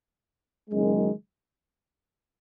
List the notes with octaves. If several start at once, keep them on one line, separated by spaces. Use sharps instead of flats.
F#1 F#2 D#3 G#3